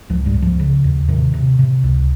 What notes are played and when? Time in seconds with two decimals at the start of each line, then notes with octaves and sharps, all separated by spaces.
0.10 C#2 F3
0.26 G2 G3
0.34 C#2
0.42 F3
0.60 C#3
0.84 D#2
1.08 C3 D#3
1.34 C3
1.59 C3
1.84 C#2